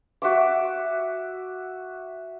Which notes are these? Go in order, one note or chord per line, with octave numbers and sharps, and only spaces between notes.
F#4 E5 D6